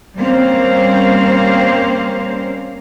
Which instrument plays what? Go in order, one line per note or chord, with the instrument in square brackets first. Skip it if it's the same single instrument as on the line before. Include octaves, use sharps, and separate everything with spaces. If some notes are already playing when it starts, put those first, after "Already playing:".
[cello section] G3 A#3 C4 C#4 C5 F5